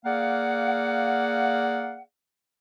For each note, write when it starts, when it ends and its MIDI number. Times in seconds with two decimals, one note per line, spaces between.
0.06 2.01 58
0.06 2.01 68
0.06 2.01 74
0.06 2.01 77
0.06 2.01 78